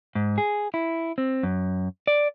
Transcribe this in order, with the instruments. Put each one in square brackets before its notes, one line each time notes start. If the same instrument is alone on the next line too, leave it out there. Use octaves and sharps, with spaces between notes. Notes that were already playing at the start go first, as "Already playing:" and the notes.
[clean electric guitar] G#2
G#4
E4
C4
F#2
D5